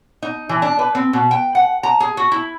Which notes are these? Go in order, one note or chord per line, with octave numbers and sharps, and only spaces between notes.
D#4
E3
D4
B4
C4
B2
G5
F#5
A#5
G#4
F#4
E4